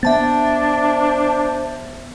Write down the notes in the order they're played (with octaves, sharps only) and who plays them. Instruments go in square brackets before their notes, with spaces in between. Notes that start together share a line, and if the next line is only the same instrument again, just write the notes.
[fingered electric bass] B3 [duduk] D4 [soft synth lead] C5 [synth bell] E5 A5 A6